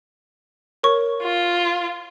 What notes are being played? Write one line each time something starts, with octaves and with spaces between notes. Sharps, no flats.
A#4 C#5 C#6
F4